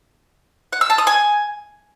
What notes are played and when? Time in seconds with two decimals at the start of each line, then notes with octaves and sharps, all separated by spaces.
0.73 F#5
0.81 E6
0.90 A5
0.98 D#6
1.07 G#5